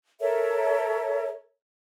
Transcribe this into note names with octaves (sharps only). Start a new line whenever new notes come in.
A4 A#4 C#5 E5